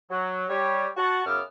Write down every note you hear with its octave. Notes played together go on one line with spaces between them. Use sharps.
F#3
G3 C#5
F#4 F#5 A5 C#6
F#2 C#3 B3 D6 E6 F6